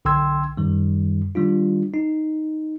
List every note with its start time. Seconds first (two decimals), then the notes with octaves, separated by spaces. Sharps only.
0.05 B1 D3 G5 C6 E6 G#6
0.57 F#2 D#3 G3
1.35 D#3 G3 D4 F4
1.94 D#4